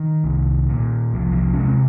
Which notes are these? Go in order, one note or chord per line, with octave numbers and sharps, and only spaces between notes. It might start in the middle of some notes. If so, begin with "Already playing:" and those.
Already playing: D#3
C2
A#2
C2 F3
D#3
F3
C#4
C3 G#3 C4